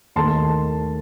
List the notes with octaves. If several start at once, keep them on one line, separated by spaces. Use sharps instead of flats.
D#2 D#3 A3 A5 C6